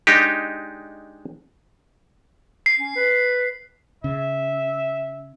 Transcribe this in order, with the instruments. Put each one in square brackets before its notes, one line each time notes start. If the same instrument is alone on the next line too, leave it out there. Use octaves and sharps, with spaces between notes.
[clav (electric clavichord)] G#3 D4 D#4 G4
[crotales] C7
[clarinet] C#4
B4
[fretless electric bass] C#3 [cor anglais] E5